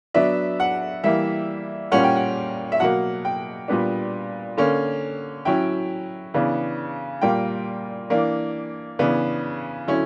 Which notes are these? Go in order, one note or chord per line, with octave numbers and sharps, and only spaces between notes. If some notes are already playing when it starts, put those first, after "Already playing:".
F#3 B3 D4 E5
F#5
E3 G3 A#3 E5
A#2 G3 A#3 C#4 F#5
G5
F#5
E5
B2 F#3 A#3 F#5
G5
A#2 G3 B3 D4
D3 A#3 C#4
F#3 C#4 E4 G5
C#3 E3 B3 D4
A#2 G3 A#3 G5
E3 A#3 D4
C#3 E3 B3 D4
D3 F#3 C#4 E4